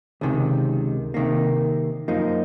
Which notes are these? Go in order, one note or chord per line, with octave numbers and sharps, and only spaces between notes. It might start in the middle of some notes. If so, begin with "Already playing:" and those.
C#2 C3 D#3
C3 D#3 A#3
F#2 F3 A#3 D#4